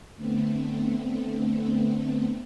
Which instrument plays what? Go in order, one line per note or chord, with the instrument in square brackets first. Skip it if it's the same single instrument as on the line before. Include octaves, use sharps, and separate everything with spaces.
[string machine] D3 A3 B3 C4